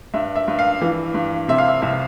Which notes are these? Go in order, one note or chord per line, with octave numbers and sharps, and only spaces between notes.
G2 E5
E5
G2
F5
E3
G2
C3 E5
F5
E5
C2 E5